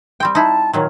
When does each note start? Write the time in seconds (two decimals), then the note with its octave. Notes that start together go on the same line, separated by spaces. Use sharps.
0.20 G3 C4 G5
0.35 D#4 E4 A5
0.73 A#2 D#3 F#3 A#4 C#5